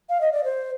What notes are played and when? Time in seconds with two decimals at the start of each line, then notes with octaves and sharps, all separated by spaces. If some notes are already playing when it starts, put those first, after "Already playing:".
0.09 F5
0.21 D#5
0.32 D5
0.44 C5